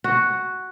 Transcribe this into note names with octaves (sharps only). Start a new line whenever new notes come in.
F#4